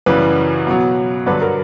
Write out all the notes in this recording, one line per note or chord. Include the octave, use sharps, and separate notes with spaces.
F#2 C#3 E3 G3 B4
B2 F#3
G2 D3 F#3 B4
A#4